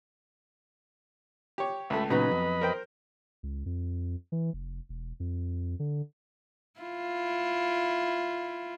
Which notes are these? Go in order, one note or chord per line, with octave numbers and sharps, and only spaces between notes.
G4 C#5
C#2 A3 E5 B5
A#2 C#3 F#3 B3 D#4 B4 D#5 B5
F2
A#4 C5 G5
C#2
F2
E3
F1
E1
F2
D3
E4 F4